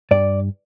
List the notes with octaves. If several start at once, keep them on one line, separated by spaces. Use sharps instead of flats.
G2 D5